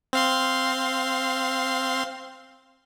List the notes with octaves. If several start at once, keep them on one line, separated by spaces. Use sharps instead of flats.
C4 F5 C6